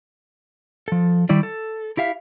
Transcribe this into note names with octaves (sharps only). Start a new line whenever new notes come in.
F3 A4
D#3 G3 E4 D5
A4
E4 G4 E5 F5